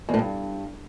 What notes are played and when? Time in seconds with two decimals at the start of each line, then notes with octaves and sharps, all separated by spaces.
0.09 E2
0.14 A2
0.19 G2